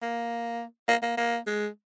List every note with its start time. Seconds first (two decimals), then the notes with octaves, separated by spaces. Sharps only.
0.02 A#3
0.88 A#3
1.03 A#3
1.17 A#3
1.47 G#3